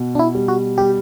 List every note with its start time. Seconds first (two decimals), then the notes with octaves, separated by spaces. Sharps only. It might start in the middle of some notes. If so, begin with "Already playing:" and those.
Already playing: B2
0.15 D4
0.19 E4
0.35 G3
0.48 F#4
0.78 G3 G4